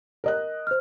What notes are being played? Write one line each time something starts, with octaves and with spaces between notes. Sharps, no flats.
A#4 D#5 F#6
C5 F6